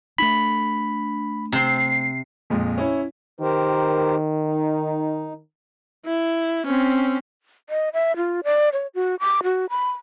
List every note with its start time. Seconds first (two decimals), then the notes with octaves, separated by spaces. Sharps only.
0.18 A3 D4 B5
1.52 C3 C4 C7
2.50 F2 A#2 G#3
2.78 C#4 E4 C#5
3.40 D#3 G4 A#4 C5
4.44 D#4
6.06 E4
6.66 C4 C#4
7.70 D#5
7.94 E5
8.17 F4
8.44 D5
8.73 C#5
8.95 F#4
9.20 D6
9.44 F#4
9.70 B5